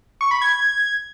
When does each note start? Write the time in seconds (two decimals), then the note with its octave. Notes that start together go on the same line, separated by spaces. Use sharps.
0.21 C#6
0.31 B5
0.42 G#6